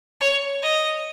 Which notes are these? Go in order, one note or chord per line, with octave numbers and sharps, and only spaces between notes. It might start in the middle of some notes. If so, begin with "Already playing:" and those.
C#5
D#5